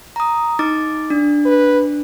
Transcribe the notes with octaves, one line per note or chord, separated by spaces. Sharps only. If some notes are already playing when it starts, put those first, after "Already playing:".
A#5 D#6
D#4 D6 A6
D4
B4